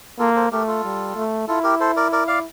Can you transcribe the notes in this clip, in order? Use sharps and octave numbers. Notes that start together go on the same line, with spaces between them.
A#3 F4 A4
A4 C5
A3 G4 A#4
F4 A4
G3
A3
E4 F4 A4
G4 A#4
A4 C5
A#4 D5
A#4 D5
D5 F5